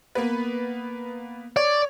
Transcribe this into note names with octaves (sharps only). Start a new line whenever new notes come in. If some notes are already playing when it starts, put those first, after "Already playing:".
A#3 B3 B4
C#5 D5